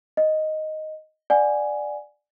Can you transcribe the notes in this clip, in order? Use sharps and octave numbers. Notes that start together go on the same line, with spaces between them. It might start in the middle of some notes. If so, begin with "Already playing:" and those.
D#5
D5 F#5 G#5